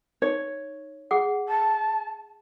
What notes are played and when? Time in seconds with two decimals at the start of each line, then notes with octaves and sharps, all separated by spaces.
0.22 D#4 C#5
1.11 G#4 F#5
1.48 A5